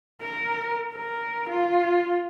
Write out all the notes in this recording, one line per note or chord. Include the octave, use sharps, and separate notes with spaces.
A#4
A#4
F4